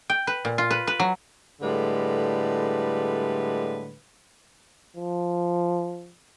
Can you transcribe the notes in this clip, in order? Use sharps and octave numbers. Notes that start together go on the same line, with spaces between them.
G5
B4
A#2
F4
B4
B4
F#3
A2 D3 G3 G#3 B4
F3